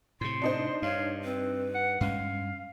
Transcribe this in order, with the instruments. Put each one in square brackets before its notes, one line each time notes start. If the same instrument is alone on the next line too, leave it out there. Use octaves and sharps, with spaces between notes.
[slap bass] A2 C3 [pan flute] C4 [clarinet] C6
[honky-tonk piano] D4 D#4 C5
[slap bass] G2 [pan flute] C#5 [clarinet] F5
[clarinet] C4 [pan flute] B4
[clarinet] F#5
[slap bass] G2 C#4 [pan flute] G#3 [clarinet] F5